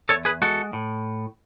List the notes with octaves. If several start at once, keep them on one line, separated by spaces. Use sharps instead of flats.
E2 A4 C#5
G#4 B4
G#3 F#4 A4
A2